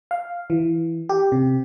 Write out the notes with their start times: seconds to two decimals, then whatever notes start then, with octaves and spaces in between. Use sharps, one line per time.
0.11 F5
0.50 E3
1.09 G4
1.32 C3